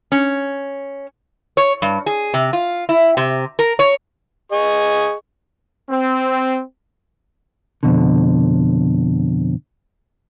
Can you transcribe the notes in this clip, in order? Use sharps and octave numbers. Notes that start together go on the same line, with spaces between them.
C#4
C#5
G2
G#4
C3
F4
E4
C3
A#4
C#5
G#4 D#5 C#6
C4
F2 B2 D3